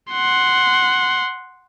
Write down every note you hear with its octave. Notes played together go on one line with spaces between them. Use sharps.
F#5 C6